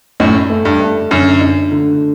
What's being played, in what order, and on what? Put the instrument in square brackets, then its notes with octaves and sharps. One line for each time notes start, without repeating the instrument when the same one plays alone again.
[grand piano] F#2 A2 [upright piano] D#4
[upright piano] A3
[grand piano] G2
[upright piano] A3
[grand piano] F#2 [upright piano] D3
[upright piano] D#4
D3